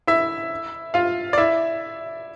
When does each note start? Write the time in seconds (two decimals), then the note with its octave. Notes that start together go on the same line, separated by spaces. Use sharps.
0.07 E4 E5
0.94 F4 F5
1.33 D5
1.38 E4 E5